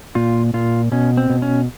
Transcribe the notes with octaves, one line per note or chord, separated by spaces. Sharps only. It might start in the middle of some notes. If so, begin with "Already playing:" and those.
A#2 F4
A#2 F4
B2 C#4
C4
B2
C#4